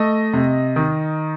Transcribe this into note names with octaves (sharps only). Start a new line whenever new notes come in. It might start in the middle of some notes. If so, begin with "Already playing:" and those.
Already playing: A3 D#5
C3
D#3